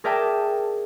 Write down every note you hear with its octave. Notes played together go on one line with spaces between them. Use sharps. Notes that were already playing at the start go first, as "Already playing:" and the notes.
G#4 A#4 D5 E5 G5 A5